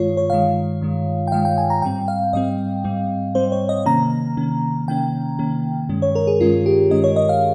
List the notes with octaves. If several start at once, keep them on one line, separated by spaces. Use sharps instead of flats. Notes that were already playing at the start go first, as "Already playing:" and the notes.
Already playing: G2 D#3 G#3 F4 C#5
C#5
G2 D#3 G#3 F5
G2 D#3 G#3
G5
G2 D#3 G#3 F5
G5
G#5
A#5
G#2 G3 C4 G5
F5
G#2 G3 C4 D#5
G#2 G3 C4
G#2 G3 C4 C5
C#5
D#5
C3 D#3 A#3 C#4 A#5
C3 D#3 A#3 C#4
C3 D#3 A#3 C#4 G5
C3 D#3 A#3 C#4
G2 D#3 G#3 C#4
C#5
A#4
G#4
G2 D#3 G#3 C#4 F4
G4
G2 D#3 G#3 C#4 D#5
C#5
D#5
F5